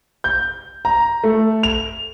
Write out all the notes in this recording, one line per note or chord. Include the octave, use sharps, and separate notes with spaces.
G6
A#5
A3
F7